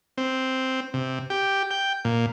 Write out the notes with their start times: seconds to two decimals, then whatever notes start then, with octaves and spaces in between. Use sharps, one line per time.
0.18 C4
0.94 C3
1.30 G4
1.71 G5
2.05 A#2